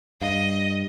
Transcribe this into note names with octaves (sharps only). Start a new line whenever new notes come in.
G2 D#5 F5